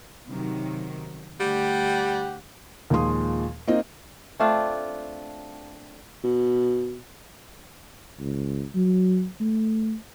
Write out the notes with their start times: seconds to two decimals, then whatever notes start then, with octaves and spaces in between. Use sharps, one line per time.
0.27 C3 D#3 F#3
1.40 D2 G3 G4 F#5
2.90 D#2 A#2 F3 G#3 C6 D#6
3.67 A#3 C4 D#4 D#5
4.40 A3 C4 D4 F4
6.24 B2
8.20 C#2
8.75 F#3
9.40 A3